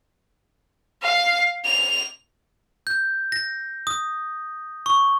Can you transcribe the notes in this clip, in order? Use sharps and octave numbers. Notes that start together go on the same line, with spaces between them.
F5
F7
G6
A#6
D#6
C#6